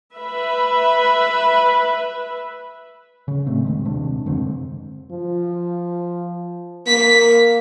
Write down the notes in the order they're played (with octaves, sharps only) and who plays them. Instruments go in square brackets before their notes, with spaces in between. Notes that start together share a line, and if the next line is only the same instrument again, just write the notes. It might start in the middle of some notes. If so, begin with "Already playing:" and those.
[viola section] B4 E5 B5
[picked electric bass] C#3
A2 A3 C4
D#1 A2 D#3 G#3
D#1 C3 D4
F#2 D3 G#3 C4
[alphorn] F3
[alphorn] A#3 [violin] B6